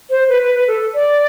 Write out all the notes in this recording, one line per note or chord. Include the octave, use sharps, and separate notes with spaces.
C5
B4
B4
B4
A4
D5